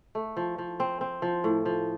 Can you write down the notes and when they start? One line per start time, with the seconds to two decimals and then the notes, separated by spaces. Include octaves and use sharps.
0.15 A3
0.37 F3
0.58 F3
0.80 C4
1.01 C4
1.22 F3
1.44 A2
1.65 F3